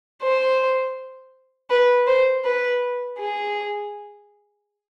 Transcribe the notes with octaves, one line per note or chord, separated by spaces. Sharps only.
C5
B4
C5
B4
G#4